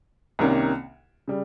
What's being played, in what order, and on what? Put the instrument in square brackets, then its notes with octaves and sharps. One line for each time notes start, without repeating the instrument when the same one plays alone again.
[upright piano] C2 C3 D#3 A#3 C#4
C#3 G3